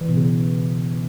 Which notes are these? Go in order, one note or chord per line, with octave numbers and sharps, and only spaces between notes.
E3
B2
C#3